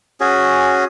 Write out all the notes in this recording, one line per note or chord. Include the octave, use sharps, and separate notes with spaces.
C#4 F#4 G#4